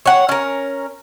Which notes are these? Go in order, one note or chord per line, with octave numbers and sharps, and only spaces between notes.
C#5 F#5
C#4 A#4